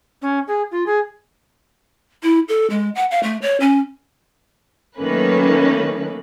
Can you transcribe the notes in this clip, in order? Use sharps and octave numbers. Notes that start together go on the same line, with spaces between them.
C#4
G#4
F4
G#4
E4
A4
G#3
F#5
F5
A3
C#5
C#4
D#3 F#3 A3 A#3 C#4 B4